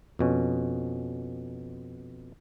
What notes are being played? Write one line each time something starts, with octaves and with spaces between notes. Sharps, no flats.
F2 B2 C#4